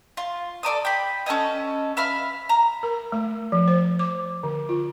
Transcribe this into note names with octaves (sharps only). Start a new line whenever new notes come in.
F4
A4 D5 A5 D#6
G5 B5
C#4 A4 C#5 D#5
E5 F5 B5 F6
A#5
A#4
A3
F3
C5
D6
D3
F4